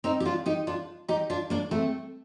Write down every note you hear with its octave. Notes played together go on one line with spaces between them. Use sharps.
C4 D#4
G4
D4 F4
D#4 G4
D4 F4
D#4 G4
D4 F4
A#3 D4
A3 C4